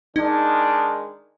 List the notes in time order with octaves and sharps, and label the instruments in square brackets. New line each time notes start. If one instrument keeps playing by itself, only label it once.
[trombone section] D#3 G#3 D4 [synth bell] D#4